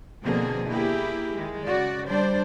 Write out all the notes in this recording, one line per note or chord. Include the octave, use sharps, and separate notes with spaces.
B2 D3 F3 A#3 C4 G#4
A#3 E4 G4 G#4
D#3 G#3
C#3 F#4 D5
G3 D4 C5 D5